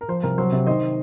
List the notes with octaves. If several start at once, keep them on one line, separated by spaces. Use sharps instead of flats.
A#4
F3 C5
C2 A#4
F#3 C5
C3
D#3 C5 D#5